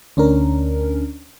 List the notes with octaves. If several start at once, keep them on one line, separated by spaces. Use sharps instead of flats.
D2 C#4 D4 A#4